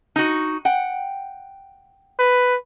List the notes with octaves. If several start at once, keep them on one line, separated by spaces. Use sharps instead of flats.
D#4 F#4
F#5 G5
B4